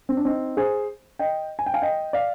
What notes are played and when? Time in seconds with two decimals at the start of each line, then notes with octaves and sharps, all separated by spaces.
0.09 C4
0.17 D4
0.25 C4 D#4
0.57 G#4 C5
1.19 D#5 G5
1.59 G#5
1.66 G5
1.74 F5 G#5
1.82 D#5 G5
2.13 D5 F5